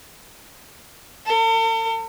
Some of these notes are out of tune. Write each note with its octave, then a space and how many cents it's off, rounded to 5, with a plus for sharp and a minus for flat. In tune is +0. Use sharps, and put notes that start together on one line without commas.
A4 +45